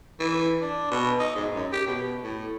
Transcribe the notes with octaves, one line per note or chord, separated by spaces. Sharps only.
E3
D4
B2
D#4
G#2
F#2
G4
B2
A2